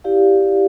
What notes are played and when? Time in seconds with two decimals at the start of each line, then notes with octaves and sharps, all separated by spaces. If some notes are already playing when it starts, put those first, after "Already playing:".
0.04 E4 G4 D5 F5